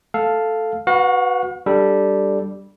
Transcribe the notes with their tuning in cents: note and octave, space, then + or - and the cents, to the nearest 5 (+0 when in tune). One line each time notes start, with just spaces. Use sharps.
A3 +0 A4 +0 F5 +0
F#4 +0 B4 +0 F5 +45
G3 +0 D4 +0 A4 +0